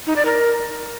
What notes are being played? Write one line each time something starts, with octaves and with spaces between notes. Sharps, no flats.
D#4
D5
A#4